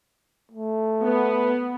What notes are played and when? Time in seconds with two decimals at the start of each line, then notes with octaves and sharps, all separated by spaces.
0.52 A3
1.02 B3